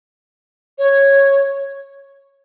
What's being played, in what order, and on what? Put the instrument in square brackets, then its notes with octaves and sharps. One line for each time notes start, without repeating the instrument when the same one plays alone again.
[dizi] C#5